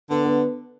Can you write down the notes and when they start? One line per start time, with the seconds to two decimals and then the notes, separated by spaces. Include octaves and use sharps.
0.10 D3 B3
0.25 B3